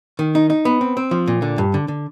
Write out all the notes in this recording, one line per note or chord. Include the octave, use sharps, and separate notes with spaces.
D#3
D#4
D#4
B3
C4
C4
F3
A#2
D3
G2
D3
D3